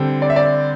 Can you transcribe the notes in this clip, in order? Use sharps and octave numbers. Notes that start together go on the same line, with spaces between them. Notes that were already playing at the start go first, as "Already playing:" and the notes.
Already playing: D3 G3 C4
D5
E5
D5